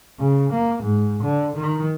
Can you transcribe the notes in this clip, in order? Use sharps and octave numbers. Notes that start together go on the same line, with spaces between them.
C#3
A#3
G#2
D3
D#3